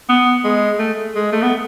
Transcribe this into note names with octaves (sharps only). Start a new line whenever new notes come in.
B3
G#3
A3
G#3
A3
B3